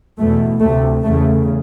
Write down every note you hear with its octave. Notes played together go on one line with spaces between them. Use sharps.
E2 B2 A3
D2 C3 A3
E2 C#3 A3